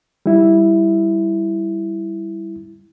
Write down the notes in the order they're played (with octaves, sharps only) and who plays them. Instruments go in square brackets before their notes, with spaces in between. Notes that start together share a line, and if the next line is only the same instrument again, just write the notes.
[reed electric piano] G3 E4